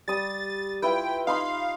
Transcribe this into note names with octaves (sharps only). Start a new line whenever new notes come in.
G3 D#6 A6
E4 F4 B4 G5
D#4 F5 B5 C6